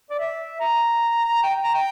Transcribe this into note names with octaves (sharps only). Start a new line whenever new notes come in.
D5
E5
A#5
G5
A#5
G5